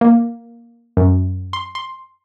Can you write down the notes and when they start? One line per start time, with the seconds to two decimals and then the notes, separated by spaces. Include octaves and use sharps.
0.01 A#3
0.97 F#2
1.53 C6
1.75 C6